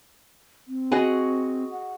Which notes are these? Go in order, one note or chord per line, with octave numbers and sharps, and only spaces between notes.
C4
F#4 G#4 D#5
F#5